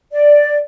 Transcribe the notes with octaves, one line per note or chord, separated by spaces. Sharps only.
D5